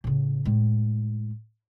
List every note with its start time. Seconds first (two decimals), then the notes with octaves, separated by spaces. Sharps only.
0.04 A2 C#3
0.45 A2 G#3